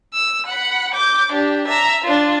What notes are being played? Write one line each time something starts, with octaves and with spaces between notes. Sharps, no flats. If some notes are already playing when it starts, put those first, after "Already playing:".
E6
F#5 B5
D6 G6
D4 G4
E5 A#5
D4 F4